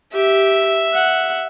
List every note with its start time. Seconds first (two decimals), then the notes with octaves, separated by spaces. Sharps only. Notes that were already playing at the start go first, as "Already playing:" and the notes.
0.14 G4 E5
0.93 F#5